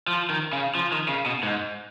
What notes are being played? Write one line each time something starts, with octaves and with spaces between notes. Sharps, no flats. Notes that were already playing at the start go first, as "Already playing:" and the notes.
F3
D#3
C#3
F3
D#3
C#3
B2
G#2